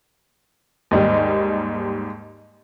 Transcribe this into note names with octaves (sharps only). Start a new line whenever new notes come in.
D#2 G#2 G3